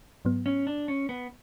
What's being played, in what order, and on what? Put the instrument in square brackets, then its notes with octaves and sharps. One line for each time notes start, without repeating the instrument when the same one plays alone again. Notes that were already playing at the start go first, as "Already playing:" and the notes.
[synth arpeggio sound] G#2 F#3 B3
[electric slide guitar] C#4
D4
C#4
B3